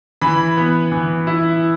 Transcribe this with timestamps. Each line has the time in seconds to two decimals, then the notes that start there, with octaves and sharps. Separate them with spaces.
0.21 E3 B5
0.57 B3
0.92 E3
1.27 E4